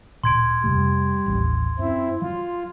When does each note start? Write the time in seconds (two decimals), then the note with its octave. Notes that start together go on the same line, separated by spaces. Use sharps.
0.24 D1 A#2 C6 G#6 D7
0.64 F2 C3 G3 A3
1.26 A1 D#2
1.79 F#2 C4 E4
2.22 F#3 F4